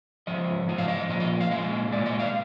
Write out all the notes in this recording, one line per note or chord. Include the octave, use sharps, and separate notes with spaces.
G#2 F3 D#5
G#2 F3 D#5
F5
D#5
A#2 F3 D#5
D#5
F5
A#2 F3 G#3 D#5
A#2 G#3 D5
D#5
F5